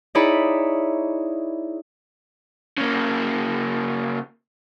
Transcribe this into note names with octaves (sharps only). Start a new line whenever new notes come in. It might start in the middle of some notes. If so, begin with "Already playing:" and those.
D#4 E4 G#4 C#5 D5 B5
C#3 A#3